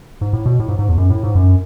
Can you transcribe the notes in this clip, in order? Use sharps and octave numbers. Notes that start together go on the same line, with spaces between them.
G#2
A2
B2
A2
G#2
G#2
E2
F#2
A2
G#2
F#2